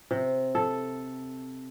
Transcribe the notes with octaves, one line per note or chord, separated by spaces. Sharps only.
C3
A4